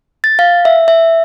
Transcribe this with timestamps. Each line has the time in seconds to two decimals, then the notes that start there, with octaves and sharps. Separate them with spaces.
0.24 A6
0.39 F5
0.65 E5
0.88 E5